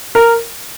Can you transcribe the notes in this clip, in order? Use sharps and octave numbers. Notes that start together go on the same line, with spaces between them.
A#4